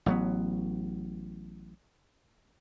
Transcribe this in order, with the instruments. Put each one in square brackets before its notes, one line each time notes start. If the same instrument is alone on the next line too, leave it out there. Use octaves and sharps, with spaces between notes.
[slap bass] A1 F#3 B3